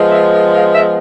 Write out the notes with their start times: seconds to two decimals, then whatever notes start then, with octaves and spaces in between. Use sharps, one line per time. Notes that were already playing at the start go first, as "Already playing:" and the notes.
Already playing: F3 G#3 B3
0.10 E5
0.55 F5
0.74 E5